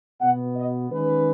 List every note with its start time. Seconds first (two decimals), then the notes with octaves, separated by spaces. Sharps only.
0.21 B2 B3 F#5
0.56 D#5
0.91 D#3 G#3 C#4 B4